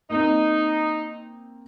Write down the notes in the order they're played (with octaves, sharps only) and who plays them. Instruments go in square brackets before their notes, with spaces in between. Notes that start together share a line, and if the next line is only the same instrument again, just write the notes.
[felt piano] A#3 C4 [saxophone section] D#4